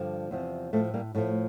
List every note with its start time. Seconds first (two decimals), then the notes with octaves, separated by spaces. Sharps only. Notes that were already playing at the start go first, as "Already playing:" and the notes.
Already playing: G2 D3 F3
0.31 E2 C3 F3
0.73 A2 F3 A3
0.94 G3 A#3
1.15 A2 F3 A3